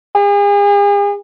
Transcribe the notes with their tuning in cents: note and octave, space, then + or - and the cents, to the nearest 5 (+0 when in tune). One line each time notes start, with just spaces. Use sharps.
G#4 -40